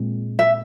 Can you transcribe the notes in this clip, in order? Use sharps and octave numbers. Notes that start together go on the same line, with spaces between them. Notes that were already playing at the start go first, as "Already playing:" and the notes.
Already playing: A#2 G#3 C4
E5